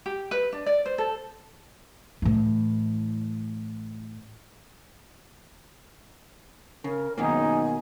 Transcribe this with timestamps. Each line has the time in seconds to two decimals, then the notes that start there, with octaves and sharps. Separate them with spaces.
0.06 G4
0.31 B4
0.52 D4
0.66 D5
0.86 C5
0.98 A4
2.22 A2 E3
6.84 C#3 A#4
7.18 G#1 F#2 B2 D#3 A#3 D#4 G#5